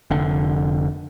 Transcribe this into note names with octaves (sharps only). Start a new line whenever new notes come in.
F1 D3